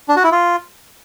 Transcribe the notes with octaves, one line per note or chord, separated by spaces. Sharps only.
D4
F#4
E4
F4